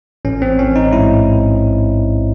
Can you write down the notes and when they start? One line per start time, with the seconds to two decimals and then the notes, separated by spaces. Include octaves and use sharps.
0.25 A1 C#4
0.42 C4
0.58 A1 C#4
0.76 D#4
0.92 G#2 E4